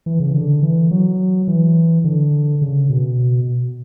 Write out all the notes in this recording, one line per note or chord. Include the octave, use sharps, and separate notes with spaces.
E3
C#3
D3
E3
F#3
E3
D3
C#3
B2